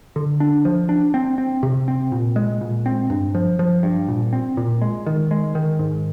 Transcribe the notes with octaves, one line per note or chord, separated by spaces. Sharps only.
D3
D4
F3
D4
C4
C4
C3
C4
A#2
G#3
A#2
C4
G2
F3
F3
G2
A#2
C4
A#2
G#3
D#3
G#3
D#3
G#2